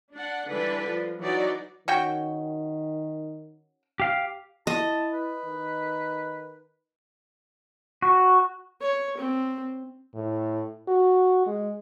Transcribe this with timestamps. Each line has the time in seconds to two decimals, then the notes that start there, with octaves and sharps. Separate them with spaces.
0.13 D4 F#5
0.48 D3 E3 G3 D4 A4 B4
0.87 F3
1.20 E3 F#3 D#4 F#4 D5
1.88 D#3 C#4 F#4 G5
4.00 G4 F5
4.67 E4 D#5 A5
5.13 B4
5.45 D#3
8.02 F#4
8.81 C#5
9.18 C4
10.15 A2
10.88 F#4
11.47 G#3